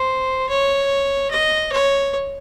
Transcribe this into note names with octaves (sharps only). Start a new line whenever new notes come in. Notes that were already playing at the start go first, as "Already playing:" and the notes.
Already playing: C5
C#5
D#5
C#5